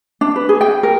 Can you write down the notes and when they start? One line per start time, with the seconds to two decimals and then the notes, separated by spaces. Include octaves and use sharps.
0.21 D4
0.36 B4
0.49 G#4
0.61 G5
0.83 A#4